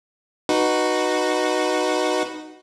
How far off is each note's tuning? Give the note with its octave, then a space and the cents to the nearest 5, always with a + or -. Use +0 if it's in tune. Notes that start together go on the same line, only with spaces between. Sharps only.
D#4 -15 F#4 +0 B4 -5